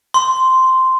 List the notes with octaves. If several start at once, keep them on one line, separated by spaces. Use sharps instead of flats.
C6